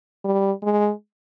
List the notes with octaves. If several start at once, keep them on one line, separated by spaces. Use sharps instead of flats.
G3
G#3